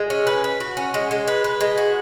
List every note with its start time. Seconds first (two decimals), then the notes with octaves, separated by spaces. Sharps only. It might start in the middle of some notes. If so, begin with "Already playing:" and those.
Already playing: G#3
0.10 C#4
0.27 B4
0.44 B4
0.60 F#4
0.77 C#4
0.94 G#3
1.11 G#3
1.28 B4
1.44 B4
1.61 G#3
1.78 F#4